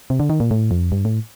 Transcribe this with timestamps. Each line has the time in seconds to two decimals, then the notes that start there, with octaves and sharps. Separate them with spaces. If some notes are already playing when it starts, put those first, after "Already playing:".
0.10 C3
0.20 D3
0.30 D#3
0.40 A#2
0.51 A2
0.71 F2
0.92 G2
1.05 A2